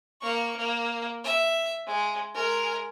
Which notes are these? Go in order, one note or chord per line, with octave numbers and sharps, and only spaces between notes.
A#3 C#6
A#3
E5
G#3
G#3 A#4